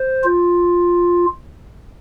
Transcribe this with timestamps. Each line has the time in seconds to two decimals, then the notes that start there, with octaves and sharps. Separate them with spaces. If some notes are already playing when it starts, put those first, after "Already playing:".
Already playing: C5
0.24 F4